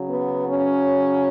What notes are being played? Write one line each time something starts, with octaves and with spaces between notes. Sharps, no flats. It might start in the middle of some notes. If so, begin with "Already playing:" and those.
Already playing: C#3 F#3
B3
C#4